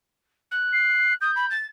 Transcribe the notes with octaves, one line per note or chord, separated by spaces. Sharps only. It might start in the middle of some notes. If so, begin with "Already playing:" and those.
F#6
C7
D#6 G6
B5
A6